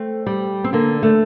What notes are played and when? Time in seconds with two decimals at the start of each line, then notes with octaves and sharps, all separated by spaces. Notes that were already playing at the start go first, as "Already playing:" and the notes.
Already playing: A3 C4
0.26 G3
0.64 C4
0.73 D3 A#3
1.03 A3